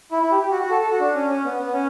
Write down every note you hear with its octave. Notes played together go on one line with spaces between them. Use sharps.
E4
E4
G4
G4
F#4
F#4
A4
A4
F#4
D4
C#4
C#4
B3
B3
C#4